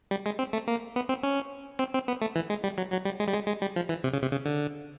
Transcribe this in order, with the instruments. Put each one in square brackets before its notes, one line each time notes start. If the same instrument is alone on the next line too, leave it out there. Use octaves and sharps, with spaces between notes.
[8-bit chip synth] G3
G#3
C4
A3
A#3
B3
C4
C#4
C4
C4
B3
A3
E3
G#3
G3
F#3
F#3
G3
G#3
G3
G#3
G#3
G3
F3
E3
C3
C#3
C3
C#3
D3